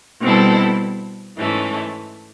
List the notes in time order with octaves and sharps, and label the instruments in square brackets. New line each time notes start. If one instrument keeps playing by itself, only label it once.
[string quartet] B2 G3 C4 E4 A4
G#2 E3 A3 C#4